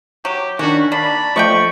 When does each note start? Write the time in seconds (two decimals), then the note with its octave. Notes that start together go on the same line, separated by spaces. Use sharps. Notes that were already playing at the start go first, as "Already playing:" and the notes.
0.25 F#3 G4
0.59 D#3 C#4 D4 F#4
0.92 A#3 D5 A5 B5
1.36 F3 A3 D5 D#5 F#5 G5 C#6